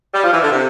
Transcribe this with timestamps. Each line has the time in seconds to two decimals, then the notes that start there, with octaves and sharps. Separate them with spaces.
0.14 G3
0.23 F3
0.31 E3
0.42 D3
0.51 C3